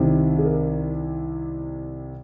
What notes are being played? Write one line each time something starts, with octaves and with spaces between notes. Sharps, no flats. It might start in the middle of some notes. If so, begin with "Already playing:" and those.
Already playing: C2 C3 D#3
G#4
A#4